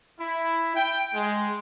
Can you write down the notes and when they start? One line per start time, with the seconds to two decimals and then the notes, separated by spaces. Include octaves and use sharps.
0.20 E4
0.76 G5
1.14 G#3